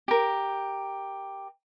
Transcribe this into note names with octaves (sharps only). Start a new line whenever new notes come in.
G4 A#4